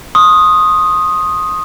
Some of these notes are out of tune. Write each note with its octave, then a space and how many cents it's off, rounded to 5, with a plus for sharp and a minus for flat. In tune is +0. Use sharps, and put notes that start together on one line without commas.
C6 +40 D#6 +0